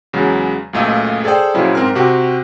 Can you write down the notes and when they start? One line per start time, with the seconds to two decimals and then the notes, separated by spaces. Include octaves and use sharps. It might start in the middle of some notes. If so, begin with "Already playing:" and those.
0.13 E2 C#3 F#3 G#3
0.73 C#2 F#2 A#2 A3 A4 D#5
1.24 G#4 A4 C5 D5 G5
1.54 A#2 C#3 F3 F#3 E4
1.75 G#2 C4 A#4 F6
1.95 C3 C4 F#4 G4